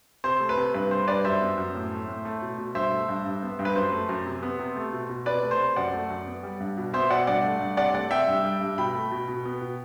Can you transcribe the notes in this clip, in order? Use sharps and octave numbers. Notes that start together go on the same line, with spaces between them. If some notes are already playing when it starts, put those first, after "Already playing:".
C3 C5
A3
B4
C3
G2 B4
G3 C5
G2 B4 D5
F#2 C5 E5
B3
F#2
A2
A3
A2
A3
B2
B2
G2 C5 E5
A3
G2
G2
B3
G2
B4
F#2 C5
A3
F#2
C3
B3
C3
A3
B2
B2
C3 B4 D5
A3
C5
C3
F#2 D5 F#5
A3
F#2
B3
G3
G2
B2
B3 C5 E5
B2 D5 F#5
G2 D5 F#5
A3
G2
C3 D5 F#5
A3 D5 F#5
C3 E5 G5
G2
G3
G2
B2 G5 B5
A3
B2
B2
B3
B2